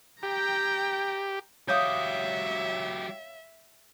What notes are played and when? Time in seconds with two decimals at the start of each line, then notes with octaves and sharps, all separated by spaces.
0.23 G4 G5 A#5
1.68 F#3 G4 C#5 E5 F5 D6 D#6 G6